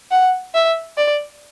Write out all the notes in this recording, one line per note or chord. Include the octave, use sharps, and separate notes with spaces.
F#5
E5
D5